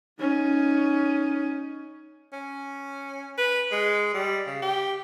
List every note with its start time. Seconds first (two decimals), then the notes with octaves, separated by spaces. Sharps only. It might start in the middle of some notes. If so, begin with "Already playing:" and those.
0.20 C#4 D#4
2.33 C#4
3.38 B4
3.72 G#3
4.14 G3
4.47 C#3
4.62 G4